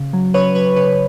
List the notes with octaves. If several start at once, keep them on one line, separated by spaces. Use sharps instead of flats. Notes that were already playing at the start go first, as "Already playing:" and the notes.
Already playing: C#3
F#3
C#3 B4 C#5
F#3 B4 C#5
C#3 B4 C#5